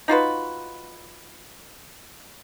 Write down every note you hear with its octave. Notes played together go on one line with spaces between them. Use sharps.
D#4 F4 F#4 B4